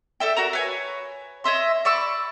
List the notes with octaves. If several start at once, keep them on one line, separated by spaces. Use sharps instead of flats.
A4 D5 E5 G5
F#4 A#4 A#5
B4 C#5 G#5
C#5 D#5 E5 C6
D5 B5 C#6 E6